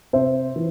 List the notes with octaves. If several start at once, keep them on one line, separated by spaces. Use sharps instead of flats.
C3 C5 E5
E3